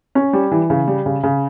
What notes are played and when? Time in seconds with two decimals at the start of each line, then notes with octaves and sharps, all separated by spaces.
0.15 C#4
0.33 G3
0.51 E3
0.70 C#3
0.88 G3
1.06 C#3
1.23 C#3